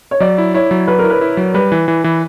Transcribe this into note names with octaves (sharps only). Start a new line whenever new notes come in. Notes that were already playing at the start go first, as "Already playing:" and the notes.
C#5
F#3 D5
E4
E4 C#5
F#3
F#3 B4
A#4
E4
B4
E4
F#3
G3 B4
E3
E3
E3